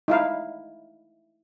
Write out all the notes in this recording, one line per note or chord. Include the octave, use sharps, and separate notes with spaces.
D#4 E4 F5